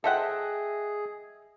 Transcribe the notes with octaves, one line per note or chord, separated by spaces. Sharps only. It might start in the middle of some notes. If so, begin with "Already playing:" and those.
G#4 A4 C5 D#5 E5 F#5 G5